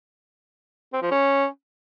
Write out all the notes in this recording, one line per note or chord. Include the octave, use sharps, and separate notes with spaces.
C4
F3
C#4